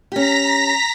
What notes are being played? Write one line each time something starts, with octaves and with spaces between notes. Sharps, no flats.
C#4 G4 A#5 A#6 B6